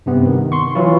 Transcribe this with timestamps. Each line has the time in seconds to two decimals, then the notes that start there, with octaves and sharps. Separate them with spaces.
0.06 G2 C3 B3
0.26 D#3
0.52 C6 C#6
0.75 E3 F#3 E4 F4